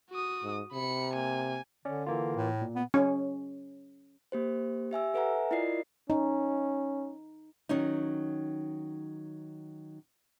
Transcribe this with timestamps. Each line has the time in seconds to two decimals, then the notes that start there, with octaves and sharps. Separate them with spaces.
0.10 F#4 D#6
0.43 G#2
0.73 C3 B5 C#7
1.13 A#3 G#5
1.85 D3 C#4 D5
2.06 E3 A#3 F4
2.36 A2
2.62 A#2
2.76 B3
2.94 C#4
4.32 A#3 G4 C5
4.91 G4 E5 G#5 E6
5.14 A4 B4 E5 F#5 G#5 A#5
5.51 E4 F4 A#4 D5 D#5 C7
6.10 C#4 D#4
7.69 D#3 F#3 C#4 D#4